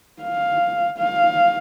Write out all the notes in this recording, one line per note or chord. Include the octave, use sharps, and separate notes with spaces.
F5
F5